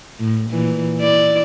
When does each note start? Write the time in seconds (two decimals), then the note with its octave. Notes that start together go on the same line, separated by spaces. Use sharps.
0.19 A2
0.50 A#2 E3
0.99 E4 D5